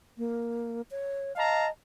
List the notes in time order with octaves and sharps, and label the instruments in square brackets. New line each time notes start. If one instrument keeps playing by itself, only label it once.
[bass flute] A#3
C#5
[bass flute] D#5 [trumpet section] F5 A5 A#5